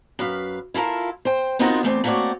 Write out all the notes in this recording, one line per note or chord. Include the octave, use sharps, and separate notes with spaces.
F#2 B4 F5
E4 F4 A4 A#4 F5
C5 G5
B3 C4 D#4 F4 F#4 A#4
E2 A3 C4 D5
A3 A#3 C4 F#4 C#5 D5